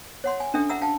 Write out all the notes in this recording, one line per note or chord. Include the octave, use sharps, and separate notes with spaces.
C#5 F#5 C6
G#5
C#4 D4 A4 E5 G5
E5 F#5 A#5 E6
F5 G5 A5